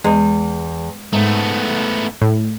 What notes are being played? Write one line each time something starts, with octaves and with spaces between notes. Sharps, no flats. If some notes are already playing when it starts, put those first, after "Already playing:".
E2 G#3
G#2 A3 B3
A2